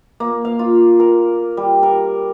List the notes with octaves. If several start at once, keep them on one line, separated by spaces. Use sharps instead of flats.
A#3
F5
F4
A#4
G3
A#4